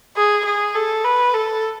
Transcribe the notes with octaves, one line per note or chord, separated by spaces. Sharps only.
G#4
G#4
A4
B4
A4